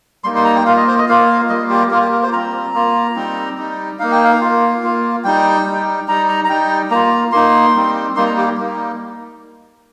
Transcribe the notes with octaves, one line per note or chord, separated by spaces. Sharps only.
G3 A#3 D#4 C6
C6
A#5
G5
A#3 F4 F5
D#5
C5
D#5
A#3 F4 F5
G3 A#3 F4 D#5
G4
A#3 F4 A#4
G4
A#4
C5
G3 C4 F4 A#5
A#3 F4
G3 C4 D#4
G3 D#4
A#3 D#4 F5
G5
F5
A#3 F4
A#3 F4
G3 D#4 G5
G3
D#4
G3 D#4 A#5
A#5
A#5
G3 D#4 G5
A#3 F4 A#5
A#3 D#4 C6
G3 C4 D#4
G3 A#3 D#4 C6
A#5
G4
G3 A#3 D#4